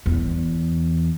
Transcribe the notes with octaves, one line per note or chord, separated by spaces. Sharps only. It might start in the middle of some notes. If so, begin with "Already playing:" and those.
E2